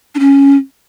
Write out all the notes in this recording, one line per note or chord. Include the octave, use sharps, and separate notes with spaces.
D4
C#4